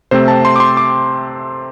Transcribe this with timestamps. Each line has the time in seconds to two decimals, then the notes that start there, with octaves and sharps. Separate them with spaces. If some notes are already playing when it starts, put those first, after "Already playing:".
0.11 C3 A3 C4 C5
0.28 A5
0.45 C6
0.56 D6
0.60 C6
0.77 D6